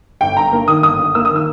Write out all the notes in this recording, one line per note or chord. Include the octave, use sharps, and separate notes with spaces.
G1 G5
G2 A#5
A#3
D#3 D#6
G1 D#6
G2
A#3 E6
D#6
D#3 E6